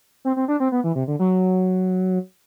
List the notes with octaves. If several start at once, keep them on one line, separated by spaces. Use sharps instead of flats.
C4
C4
D4
C4
B3
E3
C3
D3
F#3